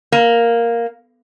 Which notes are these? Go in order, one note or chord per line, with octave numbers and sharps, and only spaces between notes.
A#3